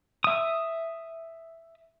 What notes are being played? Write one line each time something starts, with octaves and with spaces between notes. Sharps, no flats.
E5 D#6